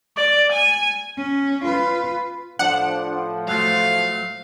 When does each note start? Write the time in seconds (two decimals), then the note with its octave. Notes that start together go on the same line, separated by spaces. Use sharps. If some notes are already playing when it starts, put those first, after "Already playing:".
0.16 D5
0.52 G#5
1.17 C#4
1.64 F4 B4
2.59 A2 F3 D4 F#5
3.48 F#3 A3 F5